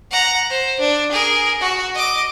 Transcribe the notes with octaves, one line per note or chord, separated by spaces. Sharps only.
F#5 A#5
C5
D4
G#4 A#4
F#4
D#5 D6